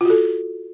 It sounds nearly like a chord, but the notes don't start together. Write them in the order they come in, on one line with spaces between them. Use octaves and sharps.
F4 F#4 A4